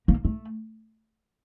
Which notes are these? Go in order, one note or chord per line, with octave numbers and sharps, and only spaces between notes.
A#3
A3